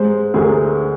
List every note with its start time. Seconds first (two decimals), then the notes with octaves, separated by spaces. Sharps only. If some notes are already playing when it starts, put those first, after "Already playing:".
Already playing: G#2 G#3 C5
0.34 D2 G#4
0.41 A#4